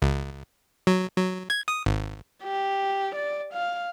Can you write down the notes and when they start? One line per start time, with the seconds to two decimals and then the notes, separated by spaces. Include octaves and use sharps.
0.02 C#2
0.87 F#3
1.16 F#3
1.50 G#6
1.68 D#6
1.86 G#1
2.43 G4
3.15 D5
3.53 F5